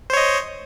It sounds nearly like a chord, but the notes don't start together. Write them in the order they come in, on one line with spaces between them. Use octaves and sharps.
C5 C#5 D#5